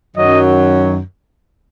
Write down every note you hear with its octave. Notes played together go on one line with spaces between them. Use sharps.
F#2 D#3 F#3 D#5